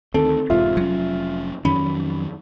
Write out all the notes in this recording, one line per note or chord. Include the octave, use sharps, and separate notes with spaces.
D2 D#3 C4 A4
E1 G#2 C3 F4 E5
F1 F#3 C#4
F2 D#3 F#3 C#4 B5